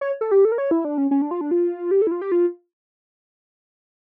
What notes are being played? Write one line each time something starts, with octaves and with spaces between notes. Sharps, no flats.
C#5
A4
G4
A4
A#4
C#5
E4
D4
C#4
C#4
D4
F4
D4
F4
G4
A4
E4
F4
G4
F4